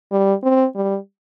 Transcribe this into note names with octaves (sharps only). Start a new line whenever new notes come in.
G3
C4
G3